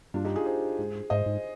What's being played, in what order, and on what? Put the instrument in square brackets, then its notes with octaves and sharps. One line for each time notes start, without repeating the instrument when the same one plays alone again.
[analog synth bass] G2 [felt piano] D4 F4
[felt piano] D#4 G4
F4 G#4
G#4 C5
[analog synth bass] G#2
[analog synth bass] G#2 [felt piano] C5 D#5
[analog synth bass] G#2